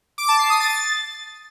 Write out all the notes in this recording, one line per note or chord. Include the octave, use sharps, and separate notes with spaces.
D6
A5
C7
D#6
A6